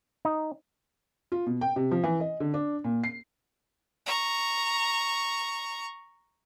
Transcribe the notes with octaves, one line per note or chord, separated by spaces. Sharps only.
D#4
F4
B2
G5
C3
F3
E3
D#5
D3
D4
A#2
C7
A#5 C#6